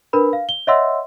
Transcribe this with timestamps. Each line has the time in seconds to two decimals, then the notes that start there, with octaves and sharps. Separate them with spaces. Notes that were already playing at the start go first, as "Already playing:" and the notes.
0.13 D4 A#4 B4 B5
0.33 F5
0.49 G7
0.67 C#5 D#5 E5 F#5 C6 E6